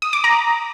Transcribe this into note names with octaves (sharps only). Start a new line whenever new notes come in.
D#6
D6
A#5